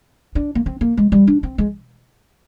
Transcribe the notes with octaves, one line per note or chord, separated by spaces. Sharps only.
D4
A#3
C4
A#3
G#3
G3
D4
C4
G#3